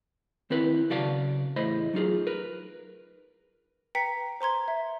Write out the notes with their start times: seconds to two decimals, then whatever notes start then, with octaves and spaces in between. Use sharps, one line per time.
0.50 D#3 C4 E4 B4
0.90 B1 C#3 F#4 D5 F5 A5
1.56 E2 A2 C5 D#5 B5
1.94 F#3 D#4 F4 G#4
2.27 A#4 B4
3.95 B4 G5 A#5 B6 C#7
4.41 C5 A#5 C6 G#6
4.68 E5